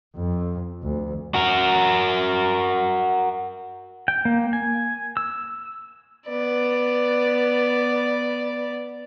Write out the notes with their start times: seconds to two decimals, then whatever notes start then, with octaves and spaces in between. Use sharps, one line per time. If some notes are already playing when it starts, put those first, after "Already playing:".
0.16 F2
0.83 D2
1.34 F#4 A#4
4.08 G5
4.25 A#3
4.53 G#5
5.17 E6
6.27 B3 D5